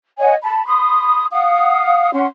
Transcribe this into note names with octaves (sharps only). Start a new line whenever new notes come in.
C#5 D#5 F#5 G#5
A5 B5
B5 C6 D#6
F5 F#5 D#6
C#4 F#5 C6